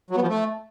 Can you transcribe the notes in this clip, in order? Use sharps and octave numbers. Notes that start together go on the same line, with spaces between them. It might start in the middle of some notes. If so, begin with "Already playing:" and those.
F#3
B3
F3
A3